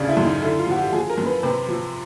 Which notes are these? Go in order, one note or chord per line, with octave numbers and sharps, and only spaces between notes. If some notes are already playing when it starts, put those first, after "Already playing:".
Already playing: D2 C#3 D4
E4
F#2
D#4
D3 E4
F4
F3 F#4
G4
F3 G#4
A#4
F#2
B4
C3 B4
F3